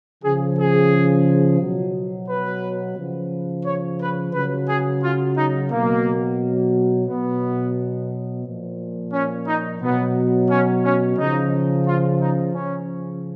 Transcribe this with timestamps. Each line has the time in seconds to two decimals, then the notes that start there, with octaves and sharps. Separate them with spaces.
0.24 C#3 F3 G#4
0.58 G#4
1.60 B2 F#3
2.29 B4
2.97 C#3 F3
3.65 C#5
4.00 B4
4.34 C#3 F#3 B4
4.68 G#4
5.03 F4
5.36 D#4
5.71 B2 F#3 A#3
7.07 B2 F#3 B3
8.44 A#2 F3
9.12 C#4
9.46 D#4
9.81 B2 F#3 B3
10.49 C#4
10.84 C#4
11.18 C#3 F3 D#4
11.86 F4
12.21 D#4
12.54 C#3 F3 C#4